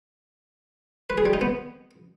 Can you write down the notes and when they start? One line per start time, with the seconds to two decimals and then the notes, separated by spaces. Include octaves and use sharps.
1.10 B4
1.18 G#4
1.26 G3
1.33 D#4
1.41 B3